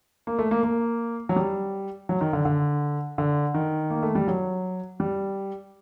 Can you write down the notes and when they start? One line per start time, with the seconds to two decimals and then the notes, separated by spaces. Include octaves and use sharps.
0.27 A#3
0.39 A3
0.51 A#3
0.63 A#3
1.29 F#3
1.36 G3
2.09 F#3
2.21 D#3
2.33 D3
2.45 D3
3.18 D3
3.54 D#3
3.90 A#3
4.03 A3
4.15 G3
4.28 F#3
5.00 G3